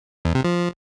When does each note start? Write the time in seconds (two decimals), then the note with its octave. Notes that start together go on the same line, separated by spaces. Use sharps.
0.25 E2
0.35 C3
0.44 F3